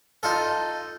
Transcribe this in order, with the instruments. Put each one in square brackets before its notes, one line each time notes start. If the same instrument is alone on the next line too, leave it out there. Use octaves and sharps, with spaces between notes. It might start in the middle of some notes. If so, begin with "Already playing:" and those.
[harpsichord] D#4 F4 A4